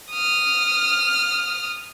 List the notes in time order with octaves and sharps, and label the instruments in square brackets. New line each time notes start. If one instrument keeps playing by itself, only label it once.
[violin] D#6 F6